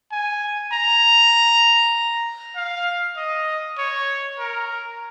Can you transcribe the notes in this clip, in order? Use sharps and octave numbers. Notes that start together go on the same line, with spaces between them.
G#5
A#5
F5
D#5
C#5
A#4